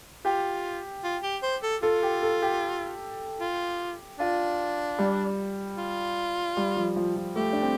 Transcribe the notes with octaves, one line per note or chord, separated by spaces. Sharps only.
F4 G4
F4
G4
C5
A4
F4 A4
G4
A4
G4
F4
D4 F4
G3
F4
G3
F3
F3
F3
A3 G4
D4
C4